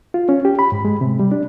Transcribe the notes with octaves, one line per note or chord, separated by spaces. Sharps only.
F4
C#4
G4
B5
G#2
G#3
C3
G3
D4